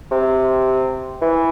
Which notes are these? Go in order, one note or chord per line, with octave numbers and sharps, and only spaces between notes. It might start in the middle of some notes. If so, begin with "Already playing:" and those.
C3
E3